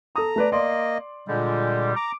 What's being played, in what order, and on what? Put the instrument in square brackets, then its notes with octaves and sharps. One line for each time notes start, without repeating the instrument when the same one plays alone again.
[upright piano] A4 D#6 [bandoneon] A#5
[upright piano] A3 B4 D5
[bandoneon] A#3 D#5 [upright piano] D5 C6
[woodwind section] A#2 G3 [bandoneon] D3 G#3
[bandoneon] A#5 [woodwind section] D6